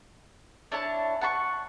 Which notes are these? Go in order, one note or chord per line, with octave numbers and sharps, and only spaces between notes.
D4 E4 C#5 A5
F#5 A5 B5 C#6